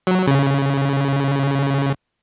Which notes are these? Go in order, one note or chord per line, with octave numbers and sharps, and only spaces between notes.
F#3
C#3